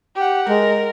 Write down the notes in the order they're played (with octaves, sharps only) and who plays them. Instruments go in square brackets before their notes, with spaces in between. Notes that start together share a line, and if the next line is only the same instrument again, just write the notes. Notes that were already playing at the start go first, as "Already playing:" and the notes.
[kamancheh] G4 F#5
[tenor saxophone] G#3 [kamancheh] A#4